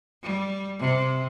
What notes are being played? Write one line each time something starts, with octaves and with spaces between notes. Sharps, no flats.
G3
C3